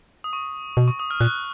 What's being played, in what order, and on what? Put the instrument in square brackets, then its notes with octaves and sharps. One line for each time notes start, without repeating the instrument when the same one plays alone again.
[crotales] D#6
C#6
[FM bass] B2
[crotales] C#6
D#6
F6
[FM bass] A#2 [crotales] F#6